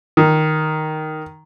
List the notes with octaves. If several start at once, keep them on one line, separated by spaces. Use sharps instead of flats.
D#3